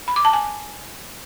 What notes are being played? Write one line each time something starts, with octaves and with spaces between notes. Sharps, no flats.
B5
D6
A5
G#5